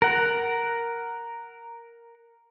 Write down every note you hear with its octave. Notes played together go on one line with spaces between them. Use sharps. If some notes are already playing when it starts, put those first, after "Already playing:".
A#4 F#5